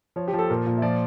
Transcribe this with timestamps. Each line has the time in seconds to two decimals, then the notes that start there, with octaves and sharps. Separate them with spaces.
0.16 F3 C#5
0.28 G4
0.33 F3
0.39 A4
0.50 A#2 A#4
0.67 A#2
0.78 E5
0.82 F3 D5